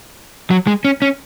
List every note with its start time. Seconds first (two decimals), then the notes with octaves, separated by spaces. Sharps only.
0.51 F#3
0.67 G#3
0.85 C#4
1.02 C#4